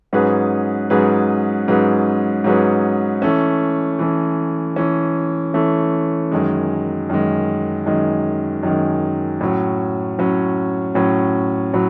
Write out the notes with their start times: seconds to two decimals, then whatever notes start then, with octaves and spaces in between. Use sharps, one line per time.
0.13 G#2 F#3 C#4 G#4 B4
0.90 G#2 F#3 C#4 G#4 B4
1.68 G#2 F#3 C#4 G#4 B4
2.44 G#2 F#3 C#4 G#4 B4
3.22 E3 A3 C#4
3.99 E3 A3 C#4
4.76 E3 A3 C#4
5.54 E3 A3 C#4
6.32 F#2 D#3 G#3
7.10 F#2 D#3 G#3
7.86 F#2 D#3 G#3
8.63 F#2 D#3 G#3
9.41 A2 F#3 C#4
10.19 A2 F#3 C#4
10.95 A2 F#3 C#4
11.74 A2 F#3